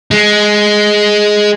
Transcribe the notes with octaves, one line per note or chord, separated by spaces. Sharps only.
G#3